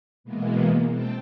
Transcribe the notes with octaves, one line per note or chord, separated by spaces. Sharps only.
B2 E3 G#3 A#3 B3
C4 G5 A5